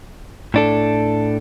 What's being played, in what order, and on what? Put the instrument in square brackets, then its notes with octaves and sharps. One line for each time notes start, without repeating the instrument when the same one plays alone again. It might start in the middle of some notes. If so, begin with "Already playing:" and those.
[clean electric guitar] A2 D4 A4